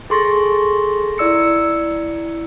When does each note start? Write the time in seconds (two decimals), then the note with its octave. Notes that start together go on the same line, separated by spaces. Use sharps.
0.10 G#4 A4 C6 C#6 A6 A#6
1.18 E4 D5 E6 C#7